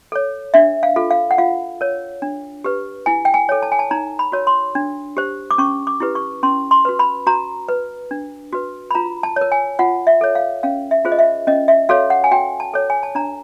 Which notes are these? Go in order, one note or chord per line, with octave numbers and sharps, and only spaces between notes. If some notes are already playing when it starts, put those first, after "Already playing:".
A4 C#5
D4 E5
F5
F4 A4
F5
F#5
F4 F5
A#4 C#5
D4
G4 B4
E4 G#5
G5
G#5
A4 C#5
A5
G#5
A5
D#4 A#5
B5
F#4 A#4 C#5
C6
D4
G4 C5
D6
C#4 C#6
D6
E4 G4 B4
C#6
C#4 C6
C6
F#4 B4
B5
F#4 A#5
B4
D4
F#4 B4
B5
F4 A#5
A5
A#4 C#5
G#5
F4 F#5
E5
A4 C#5
F5
C#4 F5
E5
F4 G#4 C5
D#5
E5
C#4 D#5
E5
F#4 A4 C#5 F5
F#5
G#5
F#4 G5
A5
A4 C#5
G#5
A5
D4 A#5